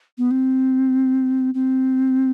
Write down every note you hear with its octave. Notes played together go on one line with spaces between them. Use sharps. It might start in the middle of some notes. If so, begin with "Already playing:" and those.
B3
C4
C4